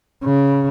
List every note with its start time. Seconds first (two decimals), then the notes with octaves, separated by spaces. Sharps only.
0.24 C#3